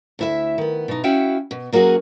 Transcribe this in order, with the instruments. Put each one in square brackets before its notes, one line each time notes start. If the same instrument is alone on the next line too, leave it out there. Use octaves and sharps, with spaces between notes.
[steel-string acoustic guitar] D2 E4 E5
D#3 B3
B2 D#4
C#4 E4 F#4 E5 F5 G5
B2
F#3 A#3 C#4 F#4 G#4